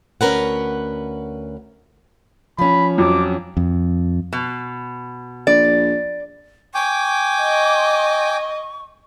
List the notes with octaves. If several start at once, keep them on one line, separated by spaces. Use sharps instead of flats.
D2 C#4 A#4 B4 F#5
F3 C#4 B5
F2 F#3 D6
F2
B2
A#1 D5
G5 G#5 C#6 D6
D#5